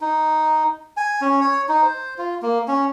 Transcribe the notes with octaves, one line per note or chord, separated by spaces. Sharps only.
D#4
G#5
C#4
C#5
D#4
C5
F4
A#3
C#4